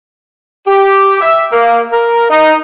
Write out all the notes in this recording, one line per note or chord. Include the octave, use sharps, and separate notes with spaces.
G4
E5
A#3
A#4
D#4